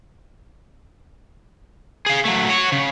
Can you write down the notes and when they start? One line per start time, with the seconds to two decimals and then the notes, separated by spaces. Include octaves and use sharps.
2.06 G#4 F5
2.25 F#3 A3
2.49 F#4 C#5
2.72 C#3